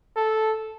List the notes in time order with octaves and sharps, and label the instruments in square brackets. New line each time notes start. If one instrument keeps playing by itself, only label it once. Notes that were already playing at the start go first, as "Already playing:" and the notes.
[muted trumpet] A4